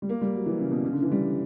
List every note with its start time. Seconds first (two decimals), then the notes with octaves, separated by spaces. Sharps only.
0.02 G3
0.09 A#3
0.21 G3
0.34 F#3
0.46 E3
0.59 C#3
0.71 B2
0.84 C#3
0.93 D3
1.02 E3
1.11 G3